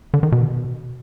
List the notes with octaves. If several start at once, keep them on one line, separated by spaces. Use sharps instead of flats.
D3
D#3
B2